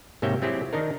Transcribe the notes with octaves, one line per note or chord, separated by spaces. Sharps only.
G#2 C3 A#3 C#5 E5 G5
F#3 C4 E4 G4 G#4
D#3 D4 D#4 A#4